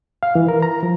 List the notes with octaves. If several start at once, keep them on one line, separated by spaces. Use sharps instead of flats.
F5
E3
A#4
A#5
F3